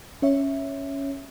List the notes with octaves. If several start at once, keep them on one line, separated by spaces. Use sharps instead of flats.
C#4 C#5 E5